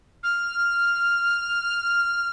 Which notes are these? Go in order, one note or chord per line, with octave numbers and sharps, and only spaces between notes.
F6